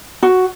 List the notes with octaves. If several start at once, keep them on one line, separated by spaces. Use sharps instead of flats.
F#4